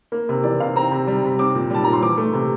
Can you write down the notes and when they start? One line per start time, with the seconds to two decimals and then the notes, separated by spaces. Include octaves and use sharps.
0.12 A#3
0.29 C3
0.44 E3 D5
0.60 C3 F5
0.76 C4 A#5
0.92 C3
1.07 G3
1.23 C3
1.39 C4 D6
1.55 A#2
1.70 G3 A5
1.84 A#2 A#5
1.93 C6
2.02 E3 D6
2.17 A3
2.33 C3